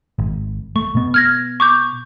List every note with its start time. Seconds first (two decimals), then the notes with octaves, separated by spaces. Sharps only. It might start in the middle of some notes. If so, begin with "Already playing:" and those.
0.19 G#1
0.76 A3 C#6
0.95 B2 B3
1.14 F6 G#6 A#6
1.60 C#6 D6 G6